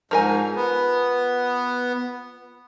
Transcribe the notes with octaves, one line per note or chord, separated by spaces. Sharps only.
G#2 F3 A#4 G#5
B3